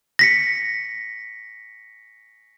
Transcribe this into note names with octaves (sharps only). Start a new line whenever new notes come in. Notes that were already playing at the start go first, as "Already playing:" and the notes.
A#6 B6 C#7